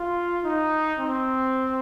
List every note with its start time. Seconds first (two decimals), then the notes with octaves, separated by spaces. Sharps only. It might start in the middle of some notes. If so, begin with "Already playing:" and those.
Already playing: F4
0.44 D#4
0.99 C4